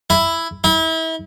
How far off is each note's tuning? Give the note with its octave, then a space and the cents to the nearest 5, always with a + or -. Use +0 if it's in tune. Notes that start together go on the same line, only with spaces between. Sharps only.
E4 +5
E4 -35